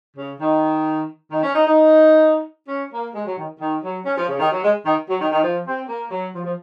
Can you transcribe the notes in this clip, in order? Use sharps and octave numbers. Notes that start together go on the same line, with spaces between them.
C#3
D#3
D#3
C#4
D#4
D#4
C#4
A#3
G#3
F#3
D#3
D#3
F#3
C#4
F3
C#3
D#3
F#3
G#3
D#3
F#3
D#3
D#3
F3
C4
A#3
F#3
F3
F3